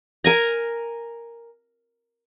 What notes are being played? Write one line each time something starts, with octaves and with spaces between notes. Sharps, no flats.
A#4 G#5 A#5